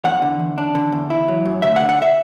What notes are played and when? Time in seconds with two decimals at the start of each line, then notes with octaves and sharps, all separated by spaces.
0.05 E2 F#5
0.22 D3
0.39 E2
0.58 D4
0.75 D3
0.92 E2
1.10 E4
1.28 F#3
1.45 F#2
1.62 D2 E5
1.76 F#5
1.80 D3
1.89 F#5
2.02 E5